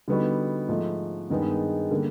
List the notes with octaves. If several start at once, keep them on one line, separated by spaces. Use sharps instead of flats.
D3 G3 B3 D#4 F#4
G#2 F3 A3
G2 D#3 G#3 B3 D#4
D3 G3 A#3